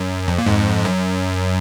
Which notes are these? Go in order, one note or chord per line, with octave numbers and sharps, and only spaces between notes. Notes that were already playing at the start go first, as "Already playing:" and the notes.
Already playing: F#2
F2
A#2
F2 G#2
F#2